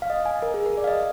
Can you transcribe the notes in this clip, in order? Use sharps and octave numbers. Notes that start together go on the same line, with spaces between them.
F5
D#5
G#5
A#4
G#4
A#4
D5
F5
D#5